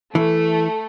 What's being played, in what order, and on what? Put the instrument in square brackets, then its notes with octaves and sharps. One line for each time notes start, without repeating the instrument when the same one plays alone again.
[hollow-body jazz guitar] E3 [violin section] A3